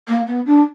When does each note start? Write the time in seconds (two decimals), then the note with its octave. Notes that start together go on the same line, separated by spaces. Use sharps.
0.08 A#3
0.27 B3
0.46 D4